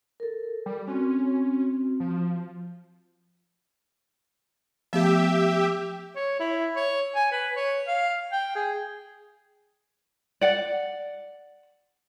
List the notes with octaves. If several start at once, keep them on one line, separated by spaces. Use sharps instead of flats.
A4 A#4
G3
C4 C#4 F#4
F3
F3 A3 B3 G4 E5
C#5
E4
C#5
G#5
B4
C#5
F5
G5
G#4
D5 F#5